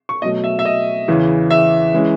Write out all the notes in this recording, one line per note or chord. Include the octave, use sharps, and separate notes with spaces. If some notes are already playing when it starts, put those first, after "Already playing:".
C#6
B2 F#3 A3 D#5
E5
E5
D#5
E2 C#3 E3
E5
E3 G#3 C#4